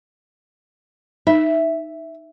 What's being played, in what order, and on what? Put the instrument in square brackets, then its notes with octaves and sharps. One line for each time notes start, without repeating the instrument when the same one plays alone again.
[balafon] D#4 [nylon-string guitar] E5